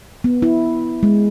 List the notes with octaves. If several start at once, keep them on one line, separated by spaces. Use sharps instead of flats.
B3
E4
G#3